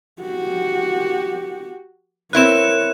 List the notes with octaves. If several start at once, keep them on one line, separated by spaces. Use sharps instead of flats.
F#4 G4
C4 E4 A#4 B4 C#5 F#6 E7